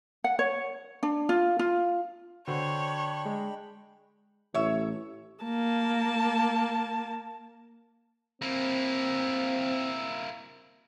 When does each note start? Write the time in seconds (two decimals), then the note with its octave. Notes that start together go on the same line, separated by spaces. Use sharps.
0.24 F#5
0.39 C#5
1.03 D4
1.29 F4
1.59 F4
2.47 D3 D4 F#4 C5 C#5 G5 B5
3.25 G#3
4.54 A1 C#5 E5
5.44 A#3 A5
8.42 A#3 C4 E4